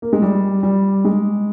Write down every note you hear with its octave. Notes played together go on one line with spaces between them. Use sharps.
A#3
G#3
G3
G3
G#3